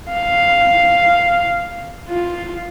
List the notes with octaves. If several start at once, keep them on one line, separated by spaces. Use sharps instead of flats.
F5
F4